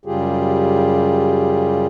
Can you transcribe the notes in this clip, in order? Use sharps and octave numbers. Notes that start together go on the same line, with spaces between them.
F#2 C#3 G3 F4 G4 G#4